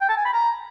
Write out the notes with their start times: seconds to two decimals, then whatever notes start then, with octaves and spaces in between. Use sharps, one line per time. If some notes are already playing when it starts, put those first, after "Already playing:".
0.01 G5
0.09 A5
0.17 G#5
0.25 B5
0.33 A#5